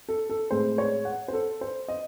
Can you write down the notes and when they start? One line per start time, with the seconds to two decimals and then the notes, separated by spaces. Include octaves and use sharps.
0.09 A4
0.30 A4
0.50 A2 G#3 C4 C5
0.78 C#5
1.05 F#5
1.28 C5
1.33 A4
1.61 C5
1.88 D#5